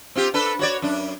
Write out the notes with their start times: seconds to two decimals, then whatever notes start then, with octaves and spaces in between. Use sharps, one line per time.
0.15 C4 F4 G4
0.34 D4 A4 B4
0.59 F#4 C#5 D5
0.82 F#2 D4